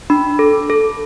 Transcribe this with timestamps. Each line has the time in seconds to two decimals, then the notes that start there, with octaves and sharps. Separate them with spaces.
0.10 D4 B5
0.39 A4
0.70 A4